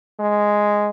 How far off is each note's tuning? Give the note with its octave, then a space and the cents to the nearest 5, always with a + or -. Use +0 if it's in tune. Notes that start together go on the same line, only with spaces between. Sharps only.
G#3 +0